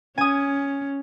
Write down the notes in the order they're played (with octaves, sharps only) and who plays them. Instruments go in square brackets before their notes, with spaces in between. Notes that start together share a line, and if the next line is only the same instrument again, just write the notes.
[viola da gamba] C#4 [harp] G#5 D#6